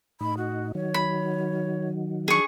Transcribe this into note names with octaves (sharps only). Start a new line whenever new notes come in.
A2 D#4 B5
F#4
D#3 F#3 C#5
B5
D4 G#4 C#6